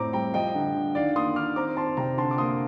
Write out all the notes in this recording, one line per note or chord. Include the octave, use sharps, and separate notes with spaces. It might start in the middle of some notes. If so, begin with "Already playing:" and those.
Already playing: A2 C4 A#5 D6
G3 G5 A#5
F3 D#5 G5
D3
D3
D#3 D5 F5
A#3 C6 D#6
D#3 D6 F6
C4 A#5 D6
C4 A5 C6
C3 G5 A#5
D3 A5 C6
D6
A#3 C6 D#6